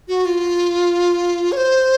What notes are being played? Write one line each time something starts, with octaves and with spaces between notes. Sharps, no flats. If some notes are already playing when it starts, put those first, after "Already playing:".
F#4
F4
C#5
C5